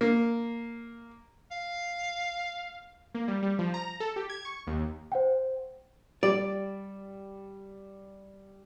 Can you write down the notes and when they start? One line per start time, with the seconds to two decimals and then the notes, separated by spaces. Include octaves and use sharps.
0.01 A#3
1.51 F5
3.15 A#3
3.28 G3
3.43 G3
3.59 F3
3.74 A#5
4.00 A4
4.16 G4
4.30 G#6
4.45 C#6
4.67 D#2
5.12 C5 F#5 G5
6.23 G3 D5